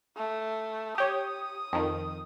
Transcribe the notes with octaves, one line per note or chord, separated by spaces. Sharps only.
A3
G4 C#5 D#6
F2 D#3